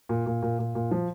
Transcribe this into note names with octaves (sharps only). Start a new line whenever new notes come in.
A#2
A#2
A#2
A#2
A#2
F3